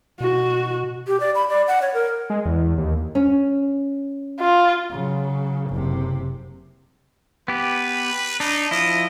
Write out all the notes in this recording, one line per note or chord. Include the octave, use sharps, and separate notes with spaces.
B2 F#4
G4
D5
B5
D5
F#5
C#5
A#4
G#3
E2
D#2
C#4
F4
C#3 F#3
F#1 C3
B3 G4 B4
D4 D#4
F3 E4 D#5